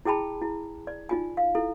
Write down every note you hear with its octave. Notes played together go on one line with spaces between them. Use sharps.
E4 G#4 G5 A5 B5
E4
D5
D#4 F4 G#5
F5
E4 A4